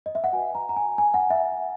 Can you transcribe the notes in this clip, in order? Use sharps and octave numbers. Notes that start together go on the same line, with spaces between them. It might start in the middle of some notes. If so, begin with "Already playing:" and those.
D#5
E5
F#5
F#4 B4 G#5
A#5
A#5
G#5
G#5
F#5
E5